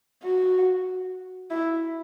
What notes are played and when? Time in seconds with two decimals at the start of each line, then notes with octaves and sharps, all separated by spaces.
0.23 F#4
1.51 E4